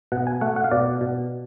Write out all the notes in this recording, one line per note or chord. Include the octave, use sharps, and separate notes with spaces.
B2 F#5
G#5
A3 F#5
F#5
F5
B2 D5
B2